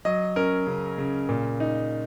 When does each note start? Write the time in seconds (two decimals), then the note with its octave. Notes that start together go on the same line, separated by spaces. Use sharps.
0.05 F#3 D#5
0.36 C#4 A#4
0.67 C#3
0.98 C#3
1.29 A#2
1.60 D#4